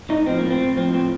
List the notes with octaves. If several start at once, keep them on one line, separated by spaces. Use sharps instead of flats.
A2 D#4
F3 C4
A2 A#3
C4
A2
F3 C4
A2 C4